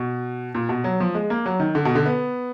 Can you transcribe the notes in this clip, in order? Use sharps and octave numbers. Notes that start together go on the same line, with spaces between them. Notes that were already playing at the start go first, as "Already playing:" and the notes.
Already playing: B2
A#2
B2
F#3
F3
G#3
A#3
F#3
D#3
D3
B2
D3
B3